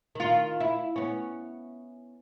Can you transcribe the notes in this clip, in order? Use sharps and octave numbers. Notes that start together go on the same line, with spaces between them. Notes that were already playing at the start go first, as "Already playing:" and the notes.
D#3 F4
E4
B3 C#4